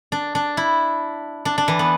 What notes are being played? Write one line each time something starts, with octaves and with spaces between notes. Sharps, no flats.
D4
D4
E4
D4
D4
E3
B3